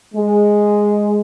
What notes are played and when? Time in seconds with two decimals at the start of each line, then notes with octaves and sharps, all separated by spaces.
0.14 G#3